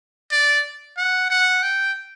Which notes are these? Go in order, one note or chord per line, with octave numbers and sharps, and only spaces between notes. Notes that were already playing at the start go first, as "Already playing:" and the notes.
D5
F#5
F#5
G5